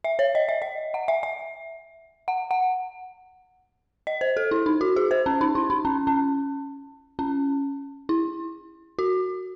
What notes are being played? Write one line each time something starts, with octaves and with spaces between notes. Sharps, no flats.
E5
C#5
D#5
E5
D#5
F#5
E5
E5
F#5
F#5
D#5
C5
A4
E4
D#4
F#4
G#4
C5
C#4
D#4
E4
D#4
C#4
C#4
C#4
E4
F#4